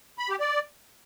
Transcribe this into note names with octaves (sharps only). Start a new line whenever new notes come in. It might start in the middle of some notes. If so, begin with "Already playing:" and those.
B5
G4
D5